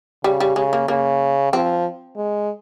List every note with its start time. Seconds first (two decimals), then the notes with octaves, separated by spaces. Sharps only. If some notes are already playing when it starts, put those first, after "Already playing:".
0.24 C#3 G3
0.40 G3
0.56 C#3 G#3
0.73 A#3
0.88 C#3 A#3
1.53 F3 C4
2.17 G#3